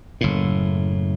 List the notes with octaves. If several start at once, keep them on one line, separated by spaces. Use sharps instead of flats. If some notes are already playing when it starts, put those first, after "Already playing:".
F#1 A2